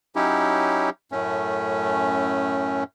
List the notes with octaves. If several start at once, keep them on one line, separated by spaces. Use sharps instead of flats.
F#3 C#4 D#4 E4 G4
F#2 A2 A3 C#4